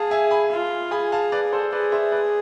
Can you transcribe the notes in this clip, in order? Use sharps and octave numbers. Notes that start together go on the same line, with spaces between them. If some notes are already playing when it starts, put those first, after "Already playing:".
Already playing: G#4 F5 A5
E5 G#5
G#5 B5
F4
G#4 G#5 B5
F5 A5
B4 D5
A4 C5
G#4 B4 D5
C5 E5
B4 D5